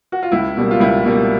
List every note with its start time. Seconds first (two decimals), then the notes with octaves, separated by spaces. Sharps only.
0.12 F#4
0.23 F4
0.32 C#2 E4
0.57 B2 G3 A#3
0.71 F4
0.80 C#2 E4
1.05 B2 G3 A#3